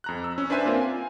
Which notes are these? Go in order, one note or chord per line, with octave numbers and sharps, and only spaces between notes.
F2 A#5 F#6
E6
C#4
D4 B4 C5 E5 G#5 C6
A#3 C4 F4
G#5